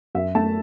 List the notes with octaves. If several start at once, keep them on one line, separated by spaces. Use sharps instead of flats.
F#2 E5
A3 A5